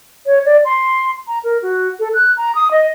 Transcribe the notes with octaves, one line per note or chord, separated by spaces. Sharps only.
C#5
D5
C6
A#5
A#4
F#4
A4
F#6
A#5
D#6
D#5